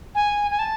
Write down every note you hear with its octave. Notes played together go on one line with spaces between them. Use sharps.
G#5
G#5
A5